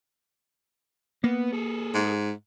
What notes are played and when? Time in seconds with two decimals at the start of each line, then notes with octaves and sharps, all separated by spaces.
1.24 A#3 B3
1.53 G#4 A4
1.94 G#2